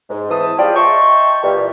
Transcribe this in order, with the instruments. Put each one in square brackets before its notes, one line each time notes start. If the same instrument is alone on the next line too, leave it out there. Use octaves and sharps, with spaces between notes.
[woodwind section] G#2
E3 C4 A5 D#6
G3 F4 G#4 C#5 D5 G5
D#5 E5 G5 A5 C6 C#6
A#2 E3 G3